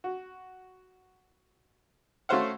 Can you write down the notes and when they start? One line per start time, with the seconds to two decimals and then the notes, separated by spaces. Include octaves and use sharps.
0.04 F#4
2.29 A3 C#4 F#4 C5 F5 F#5